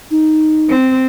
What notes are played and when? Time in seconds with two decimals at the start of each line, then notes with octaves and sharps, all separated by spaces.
0.11 D#4
0.70 C4